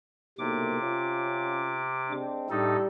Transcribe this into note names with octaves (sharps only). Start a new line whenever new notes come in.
B1 A2 C3 A#3 D6
C#4 F4
G#3 C4 D4
A2 G3 D4 D#4 A4